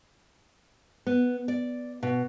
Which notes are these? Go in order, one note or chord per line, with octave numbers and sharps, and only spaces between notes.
B3
D5
B2